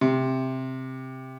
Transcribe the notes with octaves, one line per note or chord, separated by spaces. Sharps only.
C3